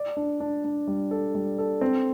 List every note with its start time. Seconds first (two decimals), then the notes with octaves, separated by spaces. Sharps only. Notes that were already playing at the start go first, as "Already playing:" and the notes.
Already playing: D5
0.17 D4
0.40 D4
0.64 D4
0.88 G3
1.11 A4
1.35 G3
1.58 A4
1.81 C4